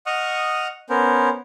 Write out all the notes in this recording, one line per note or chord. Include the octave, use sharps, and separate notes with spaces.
D#5 F#5 C#6 D#6 F6
B3 C#4 A#4 C5